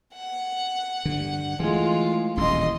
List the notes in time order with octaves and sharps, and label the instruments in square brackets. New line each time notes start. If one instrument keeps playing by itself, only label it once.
[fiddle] F#5
[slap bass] G2 D3
[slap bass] E3 A3 [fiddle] G#3 F4
[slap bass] D#1 A1 D2 [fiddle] D#5 C6